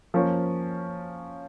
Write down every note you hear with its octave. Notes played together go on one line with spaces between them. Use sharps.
F3 A#3 C#4